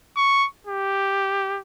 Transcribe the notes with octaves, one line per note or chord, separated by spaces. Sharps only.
C#6
G4